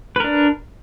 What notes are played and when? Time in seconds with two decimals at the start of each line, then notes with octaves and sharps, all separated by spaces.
0.16 B4
0.20 A#4
0.24 D4